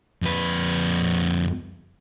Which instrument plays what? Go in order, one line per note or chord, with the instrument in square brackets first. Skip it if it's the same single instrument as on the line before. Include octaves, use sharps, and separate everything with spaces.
[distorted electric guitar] F2 B4